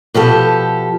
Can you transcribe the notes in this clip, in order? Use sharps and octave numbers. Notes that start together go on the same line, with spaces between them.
B2 F3 G4 A4